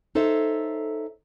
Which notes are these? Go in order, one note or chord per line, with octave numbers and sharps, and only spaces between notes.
D#4 A4 C5 C#5 E5